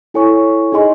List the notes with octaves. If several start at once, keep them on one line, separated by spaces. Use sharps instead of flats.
E4 A4 C#5 G#5 C#6
D#4 G#4 D#5 G#5 C6